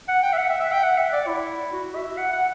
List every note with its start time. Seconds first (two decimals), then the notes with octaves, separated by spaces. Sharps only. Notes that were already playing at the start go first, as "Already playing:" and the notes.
0.08 F#5
0.23 G5
0.33 E5
0.38 F#5
0.49 E5
0.60 E5
0.72 G5
0.83 F#5
0.98 E5
1.13 D5
1.27 E4
1.73 F#4
1.95 E5
2.18 F#5
2.33 F#5